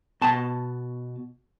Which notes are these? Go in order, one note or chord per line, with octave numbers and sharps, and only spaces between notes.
B2 A5